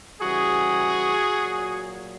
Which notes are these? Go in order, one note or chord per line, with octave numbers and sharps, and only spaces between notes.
C#3 E3 G3 F#4 G#4
A#2 F#3